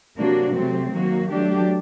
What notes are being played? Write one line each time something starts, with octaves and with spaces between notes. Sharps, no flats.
C3 F#3 A#3 D4 F#4
C3 F#3 A3 C4
D#3 F#3 A#3 F#4
F#3 A3 D4 G4